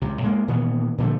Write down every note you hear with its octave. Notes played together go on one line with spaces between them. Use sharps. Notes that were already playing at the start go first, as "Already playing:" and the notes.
C#2 C3
A2 G#3 A#3
A#2 D#3 E3 B3
A#2 D3 F3 A3